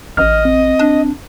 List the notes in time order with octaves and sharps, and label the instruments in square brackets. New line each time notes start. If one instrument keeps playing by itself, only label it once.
[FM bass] A1 [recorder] D#5 [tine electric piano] F6
[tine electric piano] C4
[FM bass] D4